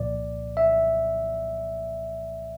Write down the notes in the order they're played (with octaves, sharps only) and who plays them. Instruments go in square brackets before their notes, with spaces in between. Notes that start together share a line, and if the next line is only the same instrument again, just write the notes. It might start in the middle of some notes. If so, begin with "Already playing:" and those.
Already playing: [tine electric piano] C2 A#2 F3 D5
E5